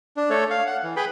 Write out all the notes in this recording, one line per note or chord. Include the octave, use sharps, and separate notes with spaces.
D4
A3 A4 C#5
F5
F#5
E3
G#4 B4 G5 B5